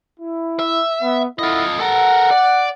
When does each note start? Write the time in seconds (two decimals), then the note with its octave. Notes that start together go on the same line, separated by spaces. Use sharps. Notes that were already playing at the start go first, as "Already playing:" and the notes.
0.20 E4
0.59 E5
1.02 B3
1.39 E4 F4 A4 D#5 F#5
1.80 A4 A#4 F#5
2.31 D5